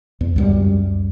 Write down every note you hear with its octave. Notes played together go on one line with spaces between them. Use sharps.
E2
C#2 F#2 G3